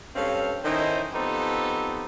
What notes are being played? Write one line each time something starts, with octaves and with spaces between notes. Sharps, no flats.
G2 C4 C#4 A4 F5
D#3 C#4 D#4 E4 A4 C5
F3 B3 C4 D#4 G4 A4